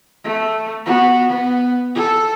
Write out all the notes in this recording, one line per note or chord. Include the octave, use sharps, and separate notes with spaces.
A3
B3 F#4
B3
A4